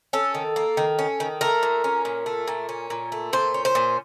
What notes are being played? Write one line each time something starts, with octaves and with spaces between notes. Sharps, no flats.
C#4 A4
D#3
A#3
D#3
C#4
D#3
A3 A#4
A#2
C#4
A#2
A3
A#2
C#4
A#2
A3
A#2 C5
C#4
C5
A#2